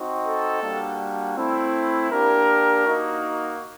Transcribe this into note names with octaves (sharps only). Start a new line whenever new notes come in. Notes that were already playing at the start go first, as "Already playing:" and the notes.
Already playing: C4 D#4 F#4
A4
G3 A#3 D4 F#4
A3 C4 E4
A#3 D4 G4 A#4
A#3 D#4 F#4